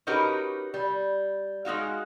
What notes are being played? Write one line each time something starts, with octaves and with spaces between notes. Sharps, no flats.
C#4 D#4 F#4 G4 A#4 B4
G3
G#3 D#4 F#4 F5